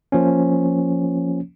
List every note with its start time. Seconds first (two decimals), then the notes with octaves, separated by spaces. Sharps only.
0.12 F3 A#3 C#4